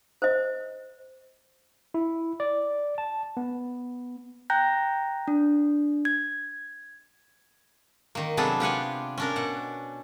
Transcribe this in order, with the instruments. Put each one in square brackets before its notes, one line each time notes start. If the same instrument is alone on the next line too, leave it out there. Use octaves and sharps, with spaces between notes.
[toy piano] C5 D#5
[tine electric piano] E4
D5
A5
B3
[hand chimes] G5 A#5 F#6 G6 A#6
D4
G#6
[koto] D#3 A#3
C3 F#3 B3 D4 G#4 A4
F4 G4 F#5 G#5
C#4 D4 A#4
B2 F#5